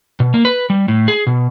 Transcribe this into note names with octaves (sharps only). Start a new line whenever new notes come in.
B2
A#3
B4
G3
A2
G#4
B2